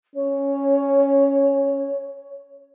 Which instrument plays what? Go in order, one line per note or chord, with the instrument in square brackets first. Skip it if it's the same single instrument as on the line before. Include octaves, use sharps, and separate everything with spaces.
[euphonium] C#4 [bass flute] C#5